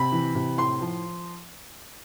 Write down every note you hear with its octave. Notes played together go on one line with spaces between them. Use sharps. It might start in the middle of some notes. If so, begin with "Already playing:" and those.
Already playing: C3 B5
E3
C3
A2 C6
F3